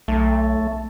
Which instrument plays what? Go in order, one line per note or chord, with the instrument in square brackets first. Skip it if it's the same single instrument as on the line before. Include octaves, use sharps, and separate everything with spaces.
[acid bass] B1 [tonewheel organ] A3